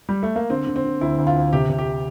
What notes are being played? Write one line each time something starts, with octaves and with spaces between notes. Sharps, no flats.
G3
A3
A#3
D3 C4
D3
C4
D3
D2 E4
D2
F4
D2
C3 G4
C3
G4